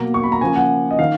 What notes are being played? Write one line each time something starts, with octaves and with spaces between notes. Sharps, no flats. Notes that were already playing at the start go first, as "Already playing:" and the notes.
Already playing: B2 F#3 A#3 A#5
C#6
B5
A#5
C#3 F3 A#3 G#5
F#5
D#5
D#3 F5